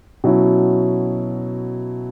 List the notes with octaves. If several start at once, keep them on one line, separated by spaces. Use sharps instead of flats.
B2 F#3 C#4 E4